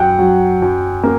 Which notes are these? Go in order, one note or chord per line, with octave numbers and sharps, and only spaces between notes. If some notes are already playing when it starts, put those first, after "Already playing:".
Already playing: F#2 F#5 G5
F#3
F#2
A#3